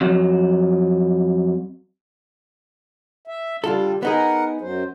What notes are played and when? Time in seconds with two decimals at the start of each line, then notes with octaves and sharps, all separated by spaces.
0.01 F2 F#3
3.27 E5
3.64 D3 G3 F4 A4
4.03 B3 D#4 G#4 A#4 F#5
4.61 F#2 F#3 C5